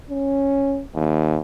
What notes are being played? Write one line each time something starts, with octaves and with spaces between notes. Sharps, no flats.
C#4
D#2